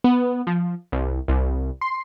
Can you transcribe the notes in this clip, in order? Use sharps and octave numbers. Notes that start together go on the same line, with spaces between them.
B3
F3
C2
C2
C6